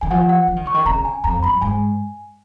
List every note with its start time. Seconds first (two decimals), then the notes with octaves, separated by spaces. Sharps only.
0.01 D#3 G#5
0.11 F3 F#5
0.29 F#5
0.48 F3
0.56 D#3
0.65 C#3 C#6
0.74 D#3
0.86 C#3 A#5
1.05 G#5
1.24 F2 A#5
1.43 F#2 B5
1.61 G#2 G#5